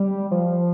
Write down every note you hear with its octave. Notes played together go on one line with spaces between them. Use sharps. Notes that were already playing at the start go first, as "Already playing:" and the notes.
Already playing: G3
F3